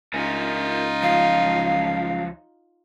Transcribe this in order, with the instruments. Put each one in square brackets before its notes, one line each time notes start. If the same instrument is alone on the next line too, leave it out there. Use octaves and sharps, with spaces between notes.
[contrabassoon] C#2 [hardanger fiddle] D#4 F4 [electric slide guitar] A#4 E5 G#5
[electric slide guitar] F3 F#3 [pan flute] F5